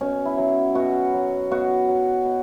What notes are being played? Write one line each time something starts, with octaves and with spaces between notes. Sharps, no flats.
B2 C#4
E4
F#3
B2 F#4
F#3
B2 F#4
F#3
B2